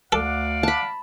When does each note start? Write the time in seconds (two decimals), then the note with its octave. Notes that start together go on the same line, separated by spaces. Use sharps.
0.12 D2 A4 D5 F5 F#5
0.63 A5 B5